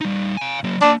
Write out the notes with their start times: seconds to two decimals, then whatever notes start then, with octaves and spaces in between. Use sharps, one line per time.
0.01 G3 D#4
0.37 F5 G#5
0.64 F#3 A#3
0.81 A#3 D4 A5